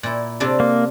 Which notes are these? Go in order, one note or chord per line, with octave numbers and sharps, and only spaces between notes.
A#2 E4
C3 D4 A4
A#3